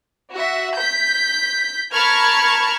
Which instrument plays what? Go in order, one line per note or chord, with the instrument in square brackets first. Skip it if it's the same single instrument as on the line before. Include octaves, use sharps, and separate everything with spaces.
[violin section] F#4 E5
G6 B6
A#4 A5 B5 C#6 F6 G#6